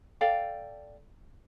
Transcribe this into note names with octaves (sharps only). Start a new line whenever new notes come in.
A4 D5 F5 G5